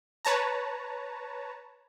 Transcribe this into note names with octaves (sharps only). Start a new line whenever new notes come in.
B4 C#5 A5 A#5